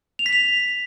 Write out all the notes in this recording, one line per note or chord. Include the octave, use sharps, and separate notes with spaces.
F7
B6
F7